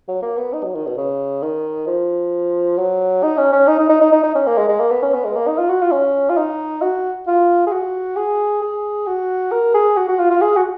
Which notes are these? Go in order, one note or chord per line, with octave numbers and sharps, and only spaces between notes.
F#3
A#3
B3
D#4
F#3
D#3
B2
C#3
D#3
F3
F#3
D#4
C#4
C#4
D#4
D#4
D#4
D#4
D#4
D#4
C#4
A#3
G#3
G#3
A#3
B3
C#4
B3
G#3
A#3
D#4
F4
F#4
F4
C#4
F4
D#4
F#4
F4
G#4
F#4
G#4
G#4
F#4
A#4
G#4
F#4
F#4
F4
F4
G#4
F#4